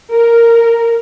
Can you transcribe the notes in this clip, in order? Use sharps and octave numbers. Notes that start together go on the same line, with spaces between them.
A#4